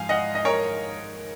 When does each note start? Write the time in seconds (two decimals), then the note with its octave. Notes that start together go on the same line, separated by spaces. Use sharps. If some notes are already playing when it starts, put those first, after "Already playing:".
Already playing: G#2 F3 F5 G#5
0.09 D#5 F#5
0.35 D#5
0.45 A#4 C#5